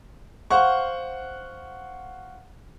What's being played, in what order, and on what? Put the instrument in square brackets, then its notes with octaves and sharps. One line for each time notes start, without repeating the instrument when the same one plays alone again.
[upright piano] C5 F5 F#5 C#6